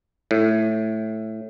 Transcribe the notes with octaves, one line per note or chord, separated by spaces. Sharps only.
A2